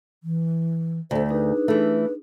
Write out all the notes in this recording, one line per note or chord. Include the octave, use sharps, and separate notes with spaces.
E3
D2 A3 C5
D4 D#4 G#4 B4
E3 A3